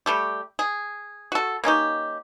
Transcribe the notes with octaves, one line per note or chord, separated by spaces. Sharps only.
G3 A3 G4
G#4
F#4 A4
A#3 C#4 D#4 G4